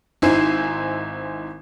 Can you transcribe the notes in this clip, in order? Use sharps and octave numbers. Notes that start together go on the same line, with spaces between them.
G#1 D#4 E4 C5 G#5 C7